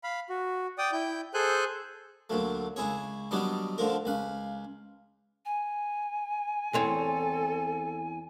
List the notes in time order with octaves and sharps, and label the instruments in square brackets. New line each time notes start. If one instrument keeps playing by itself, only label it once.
[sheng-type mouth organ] F5 B5
F#4
D5 G5 D#6
E4 G5 G6
G#4 A4 C5 G#5 F#6 G6
[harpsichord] D2 A#2 F#3 A3
C#2 E4 G#4 C#5
D#3 F#3 G3 B3 D4 D#4
D3 F3 A3 A#4
C#2 B4 F5
[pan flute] G#5
[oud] E2 C4 C#5 [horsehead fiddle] A4